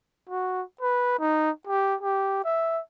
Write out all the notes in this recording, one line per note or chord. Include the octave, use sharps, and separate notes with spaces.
F#4
B4
D#4
G4
G4
E5